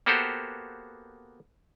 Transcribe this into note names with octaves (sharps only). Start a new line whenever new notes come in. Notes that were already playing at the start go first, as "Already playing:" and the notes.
A#3 B3 F#4 G4 A4 C5